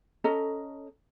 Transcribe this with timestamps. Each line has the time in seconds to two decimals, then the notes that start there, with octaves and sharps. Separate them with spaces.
0.24 C#4 A4 D#5 A#5